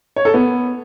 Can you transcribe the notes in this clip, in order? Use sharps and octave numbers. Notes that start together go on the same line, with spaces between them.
C#5
A4
B3